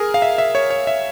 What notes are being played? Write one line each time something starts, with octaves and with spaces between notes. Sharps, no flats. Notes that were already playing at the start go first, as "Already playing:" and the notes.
Already playing: G#4 A#4
F5
E5
E5
C#5
C#5
E5